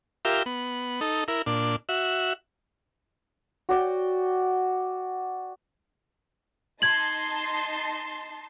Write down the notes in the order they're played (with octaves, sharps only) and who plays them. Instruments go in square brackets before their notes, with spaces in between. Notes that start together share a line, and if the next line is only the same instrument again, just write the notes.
[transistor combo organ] F4 G4 A#4 E5
B3
D#4 A4
E4 A#4
A#2 D4
F#4 E5
[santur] F#4 D5 G5
[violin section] D#4 A5 C6 [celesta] G#6 F#7